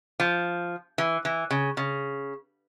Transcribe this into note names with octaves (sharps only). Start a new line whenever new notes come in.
F3
E3
E3
C#3
C#3